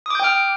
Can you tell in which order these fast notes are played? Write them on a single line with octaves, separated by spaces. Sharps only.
D#6 D6 G6 G5 F6